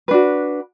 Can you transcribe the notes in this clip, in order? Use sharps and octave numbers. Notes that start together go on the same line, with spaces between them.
D4 F#4 B4